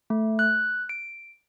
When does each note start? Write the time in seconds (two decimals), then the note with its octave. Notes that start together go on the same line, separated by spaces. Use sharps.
0.10 A3
0.39 F#6
0.89 D7